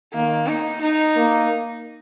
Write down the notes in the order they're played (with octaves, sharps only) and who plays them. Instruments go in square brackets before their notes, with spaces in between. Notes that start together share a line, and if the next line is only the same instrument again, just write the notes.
[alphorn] D#3 [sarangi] A#3
[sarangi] D#4
D#4
[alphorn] A#3